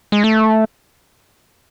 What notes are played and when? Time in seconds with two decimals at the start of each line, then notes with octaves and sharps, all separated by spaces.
0.12 G#3
0.24 A3